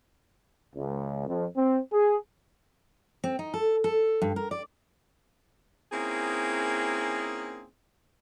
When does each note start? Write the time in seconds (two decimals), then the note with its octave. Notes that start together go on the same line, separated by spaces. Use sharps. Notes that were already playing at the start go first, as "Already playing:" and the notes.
0.75 C#2
1.27 F2
1.57 C4
1.92 G#4
3.24 C4
3.39 D#4
3.54 A4
3.84 A4
4.22 G2
4.36 A#4
4.51 D5
5.92 A#3 C4 C#4 D#4 E4 G#4